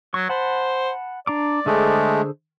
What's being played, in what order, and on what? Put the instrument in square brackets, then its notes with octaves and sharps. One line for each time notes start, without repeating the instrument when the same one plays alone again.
[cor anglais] F#3 [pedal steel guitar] C#6
[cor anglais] C5 [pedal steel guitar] F#5 A5 B5
[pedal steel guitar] D4 A#5 D6 [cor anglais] D5
[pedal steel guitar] D3 G#4 C5 [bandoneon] G#3 A3